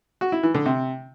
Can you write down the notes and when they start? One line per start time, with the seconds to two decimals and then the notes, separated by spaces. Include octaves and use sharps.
0.21 F#4
0.32 E4
0.43 E3
0.55 D3
0.66 C3